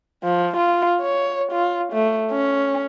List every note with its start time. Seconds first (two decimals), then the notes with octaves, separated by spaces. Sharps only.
0.24 F3
0.57 F4
1.01 C#5
1.52 F4
1.93 A3
2.31 C#4